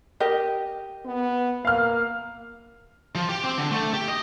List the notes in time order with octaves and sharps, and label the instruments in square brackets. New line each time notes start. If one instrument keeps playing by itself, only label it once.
[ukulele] G4 A#4 D#5
[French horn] B3
[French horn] A#3 [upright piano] F5 F6
[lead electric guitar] F3
G4
C4
D3
A3
G4
D#5